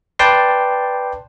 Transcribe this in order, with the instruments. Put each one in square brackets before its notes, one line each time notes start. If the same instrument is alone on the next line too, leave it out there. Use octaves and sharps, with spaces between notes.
[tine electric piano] B4 D5 G5 A5 C6